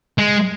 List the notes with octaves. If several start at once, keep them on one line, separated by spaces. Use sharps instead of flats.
G#3